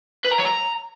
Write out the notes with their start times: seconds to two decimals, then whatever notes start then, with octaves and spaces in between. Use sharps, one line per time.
0.24 B4
0.31 A#5
0.38 C#5
0.45 A#5